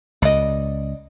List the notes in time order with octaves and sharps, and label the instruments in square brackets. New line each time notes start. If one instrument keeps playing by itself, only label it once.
[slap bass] C#2 [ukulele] D5 D#5